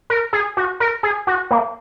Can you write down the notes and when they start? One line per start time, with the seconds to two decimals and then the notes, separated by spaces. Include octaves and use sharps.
0.10 A#4
0.33 G#4
0.57 F#4
0.80 A#4
1.03 G#4
1.27 F#4
1.51 A#3